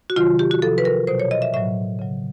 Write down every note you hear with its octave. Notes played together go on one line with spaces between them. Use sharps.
F#4
C3 D#3 F#3 F4
G4
F#4
C3 F3 A4
B4
A#4
B2 F#3 C5
C#5
D#5
E5
A2 F#3 E5
C#3 F#3